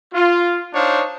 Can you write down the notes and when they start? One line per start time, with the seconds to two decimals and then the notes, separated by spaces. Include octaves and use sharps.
0.13 F4
0.73 D4 D#4 C5 C#5 F5